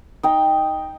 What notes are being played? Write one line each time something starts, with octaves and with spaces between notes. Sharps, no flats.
D#4 G5